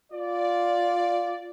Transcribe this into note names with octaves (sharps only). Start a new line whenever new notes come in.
F4 D5